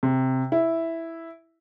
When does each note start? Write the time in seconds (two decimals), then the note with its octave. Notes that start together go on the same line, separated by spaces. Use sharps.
0.03 C3
0.52 E4